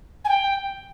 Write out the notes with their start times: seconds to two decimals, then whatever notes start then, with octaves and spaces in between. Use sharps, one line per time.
0.25 G#5
0.29 G5